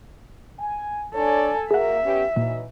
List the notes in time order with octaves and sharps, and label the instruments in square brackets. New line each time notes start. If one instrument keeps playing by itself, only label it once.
[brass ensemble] G#5
[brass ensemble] D4 C#5 D5 [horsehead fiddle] A4 G#5
[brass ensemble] A#3 F#4 A#4 [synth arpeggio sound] G#4 F#5 [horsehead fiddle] E5
[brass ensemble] B3 C#4 G4
[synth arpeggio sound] A#2 [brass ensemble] E3 F#3 D#4